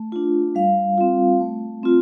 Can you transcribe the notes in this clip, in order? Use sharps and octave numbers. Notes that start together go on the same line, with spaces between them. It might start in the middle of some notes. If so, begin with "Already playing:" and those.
Already playing: A3
D4 F4
G3 F5
C4 F4
A3
C4 F4